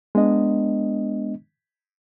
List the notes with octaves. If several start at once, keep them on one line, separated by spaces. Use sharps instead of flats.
G#3 B3 D4 D#5